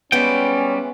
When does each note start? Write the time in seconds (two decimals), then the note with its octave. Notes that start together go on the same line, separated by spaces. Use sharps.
0.12 G3 G#3 B3 C#4 E4 G5